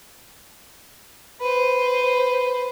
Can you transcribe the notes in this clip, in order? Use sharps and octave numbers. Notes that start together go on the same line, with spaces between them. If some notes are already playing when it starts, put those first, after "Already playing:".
B4 C5